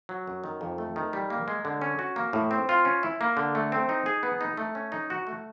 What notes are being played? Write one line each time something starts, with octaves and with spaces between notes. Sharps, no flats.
F#3
F#2
D#3
F2
A3
D#3
G3
A#3
G#3
D3
C#4
F#4
A#3
A2
C4
F4
C#4
E4
A#3
D3
A3
C4
D#4
G#4
B3
D#4
A3
C#4
D#4
F#4
A3